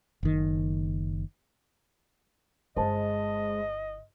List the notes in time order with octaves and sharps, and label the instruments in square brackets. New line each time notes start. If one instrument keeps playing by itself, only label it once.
[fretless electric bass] F#1 D#3
[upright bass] G1 E4 [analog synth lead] G#3 [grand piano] C5 A5 [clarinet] D#5